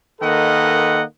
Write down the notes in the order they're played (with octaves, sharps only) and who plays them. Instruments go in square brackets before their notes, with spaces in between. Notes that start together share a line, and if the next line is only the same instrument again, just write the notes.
[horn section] D#3 A#3 A4 B4 D#5 F#5